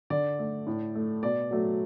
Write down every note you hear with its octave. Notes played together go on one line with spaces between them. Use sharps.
D3 D5
A3
A2
A3
B2 D5
F#3 A3